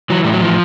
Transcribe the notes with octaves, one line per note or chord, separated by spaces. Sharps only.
E3 F#3
A2 G3
F#3
E3 F3